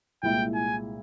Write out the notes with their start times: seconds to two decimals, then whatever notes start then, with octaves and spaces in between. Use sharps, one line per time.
0.23 C2 A#2 G#3 E4 G5
0.54 G#5